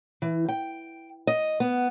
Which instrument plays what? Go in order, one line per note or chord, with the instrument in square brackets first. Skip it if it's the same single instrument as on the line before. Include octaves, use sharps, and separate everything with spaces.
[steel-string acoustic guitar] E3
G5
D#5
B3